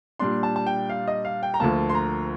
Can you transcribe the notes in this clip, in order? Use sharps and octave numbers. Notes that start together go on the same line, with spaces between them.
A#2 G3 D4 C6
A5
A5
G5
F5
D#5
F5
G5
A#5
D2 D3 F3 A#3 A5
C6
A#5